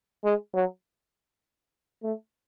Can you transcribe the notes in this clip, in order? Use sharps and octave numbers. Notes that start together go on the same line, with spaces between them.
G#3
F#3
A3